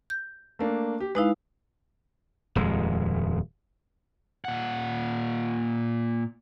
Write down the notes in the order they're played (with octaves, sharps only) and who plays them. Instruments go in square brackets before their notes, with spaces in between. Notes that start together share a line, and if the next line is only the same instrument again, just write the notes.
[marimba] G6
[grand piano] A3 A#3 D4
G4
[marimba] G#3 D#4 E4 [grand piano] B4 F5
[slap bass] D#1 F2 G#3
[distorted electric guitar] A#2 F#5